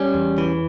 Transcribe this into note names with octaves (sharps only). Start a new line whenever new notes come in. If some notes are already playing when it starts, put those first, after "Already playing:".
Already playing: G3 C#4
E2
E3